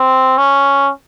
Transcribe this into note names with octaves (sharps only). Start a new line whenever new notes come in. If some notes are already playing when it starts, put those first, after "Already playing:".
Already playing: C4
C#4